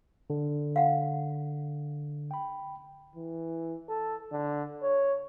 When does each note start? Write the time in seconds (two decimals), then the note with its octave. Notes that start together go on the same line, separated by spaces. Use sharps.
0.30 D3
0.76 F5 F#5
2.31 G5 B5
3.16 E3
3.89 A4
4.31 D3
4.82 C#5